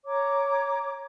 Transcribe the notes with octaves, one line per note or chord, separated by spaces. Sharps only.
C#5 A#5 D6